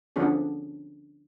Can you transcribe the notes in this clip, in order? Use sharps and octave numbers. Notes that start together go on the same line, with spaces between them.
D3 F3 B3 C#4 D4 G#4